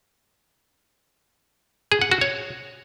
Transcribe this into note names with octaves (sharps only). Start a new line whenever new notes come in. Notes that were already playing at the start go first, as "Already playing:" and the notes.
G#4
F#5
F#4
C#5